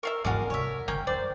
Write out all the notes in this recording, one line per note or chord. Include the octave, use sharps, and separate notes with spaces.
A#4 E5 F5 C#6
E2 G#2 D3 F#4 G#4 A#4 D5 F5
C3 C#5 E5
D3 E3 A#3 C#4 G5
F#2 E3 C5 D5